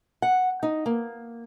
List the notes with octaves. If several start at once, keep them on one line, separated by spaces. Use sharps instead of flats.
F#5
D#4
A#3